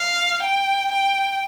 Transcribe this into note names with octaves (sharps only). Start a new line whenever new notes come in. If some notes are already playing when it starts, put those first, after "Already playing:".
Already playing: F5
G5
G5